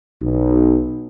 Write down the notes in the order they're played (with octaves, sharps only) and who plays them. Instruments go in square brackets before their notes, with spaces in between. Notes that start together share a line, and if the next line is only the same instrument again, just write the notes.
[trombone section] B1